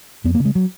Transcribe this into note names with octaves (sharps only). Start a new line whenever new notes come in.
F2 B3
A#3
C#3
G#3
F#3